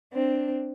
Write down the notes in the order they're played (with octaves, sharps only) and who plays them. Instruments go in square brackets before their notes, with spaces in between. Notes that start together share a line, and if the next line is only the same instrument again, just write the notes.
[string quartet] C4 D4